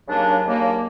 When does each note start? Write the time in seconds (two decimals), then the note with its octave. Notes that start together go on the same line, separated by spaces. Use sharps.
0.07 D#2 C#3 F#3 A#3 D4
0.44 D#2 C#3 F#3 A#3 D4